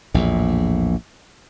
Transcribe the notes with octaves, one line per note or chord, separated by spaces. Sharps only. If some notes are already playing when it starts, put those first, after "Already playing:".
A#1 E2 A2